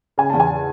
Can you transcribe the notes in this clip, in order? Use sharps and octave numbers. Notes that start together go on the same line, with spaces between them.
C#3 G#5
E2 A5
G#5